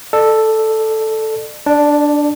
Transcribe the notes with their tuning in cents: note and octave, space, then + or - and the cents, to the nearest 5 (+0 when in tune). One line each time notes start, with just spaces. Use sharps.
A4 +0 D5 +40
D4 +0 D5 +35